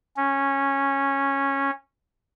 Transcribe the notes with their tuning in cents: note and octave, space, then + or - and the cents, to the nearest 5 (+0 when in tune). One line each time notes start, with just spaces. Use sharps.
C#4 -10